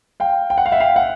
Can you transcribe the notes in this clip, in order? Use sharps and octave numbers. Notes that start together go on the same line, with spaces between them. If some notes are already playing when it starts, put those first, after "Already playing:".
F5 G5
G5
F#5
F5
E5 F#5
F5 G5
E5 F#5